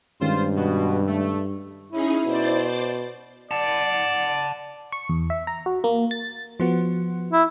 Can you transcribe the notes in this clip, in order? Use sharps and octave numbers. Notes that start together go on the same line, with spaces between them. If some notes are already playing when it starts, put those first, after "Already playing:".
G2 D#3 G#3 C#4 F4 C5
B2
A3
C#4 D#4 E4 G#4
B2 C5 D5 A6
D5 F#5 A5
C#6
E2
E5
A#5
F#4
A#3
A6
F3 B3 F#4
E4